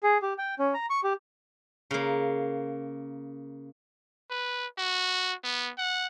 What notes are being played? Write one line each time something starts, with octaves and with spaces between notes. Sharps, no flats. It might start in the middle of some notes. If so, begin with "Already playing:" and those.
G#4
G4
G5
C#4
A#5
C#6
G4
C#3 A#3
B4
F#4
B3
F#5